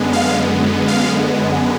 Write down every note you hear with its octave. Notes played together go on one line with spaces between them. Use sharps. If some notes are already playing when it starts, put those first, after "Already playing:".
Already playing: F#2 D3 G#3 B3
F5
F5